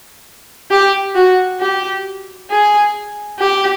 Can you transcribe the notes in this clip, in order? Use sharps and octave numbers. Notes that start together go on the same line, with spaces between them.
G4
F#4
G4
G#4
G4